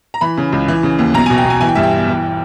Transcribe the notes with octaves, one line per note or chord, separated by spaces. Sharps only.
A#5
E3 B5
C#3
C#2
E3
C#3
D#2
B1 A#5
B2 G#5
G5
B2
G#5
E3 G#5
G5
G2 E5
G5
G1
E3